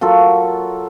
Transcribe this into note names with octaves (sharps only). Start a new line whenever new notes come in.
F#3 F4 A4 A#4